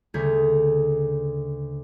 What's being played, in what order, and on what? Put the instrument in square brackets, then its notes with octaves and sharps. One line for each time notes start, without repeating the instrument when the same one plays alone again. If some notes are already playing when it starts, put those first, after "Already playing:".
[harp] D2 C#3 G6 G#6 B6